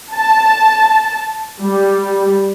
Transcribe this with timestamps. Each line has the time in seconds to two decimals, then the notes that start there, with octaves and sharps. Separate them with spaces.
0.15 A5
1.62 G3